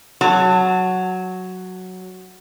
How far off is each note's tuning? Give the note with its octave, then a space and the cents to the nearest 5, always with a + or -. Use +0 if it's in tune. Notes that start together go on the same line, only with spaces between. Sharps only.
F#3 +0 A5 +25